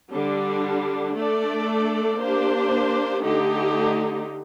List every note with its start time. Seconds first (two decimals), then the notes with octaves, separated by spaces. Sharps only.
0.11 D3 G3 D4
1.15 A3 D4 A4 D5
2.19 A#3 D4 G4 C5
3.22 D3 A3 D#4 G4